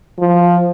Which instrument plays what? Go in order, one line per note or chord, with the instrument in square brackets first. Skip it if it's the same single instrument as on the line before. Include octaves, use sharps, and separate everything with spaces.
[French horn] F3